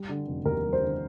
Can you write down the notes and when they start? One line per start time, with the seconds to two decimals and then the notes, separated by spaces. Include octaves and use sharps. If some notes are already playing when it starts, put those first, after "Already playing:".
Already playing: G3
0.09 D3
0.27 F1
0.45 D#2 A#4
0.64 G3
0.73 C5
0.81 D3